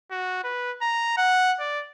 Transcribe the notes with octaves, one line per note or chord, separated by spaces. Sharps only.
F#4
B4
A#5
F#5
D5